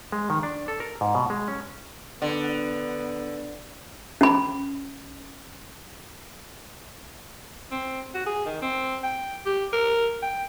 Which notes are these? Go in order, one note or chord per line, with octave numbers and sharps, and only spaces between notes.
G#3
D#3
D4
A4
A#4
G#2
B2
G#3
C#4
D3 B3
C#4 B5
C4
F#4
G#4
D#3
C4
G5
G4
A#4
G5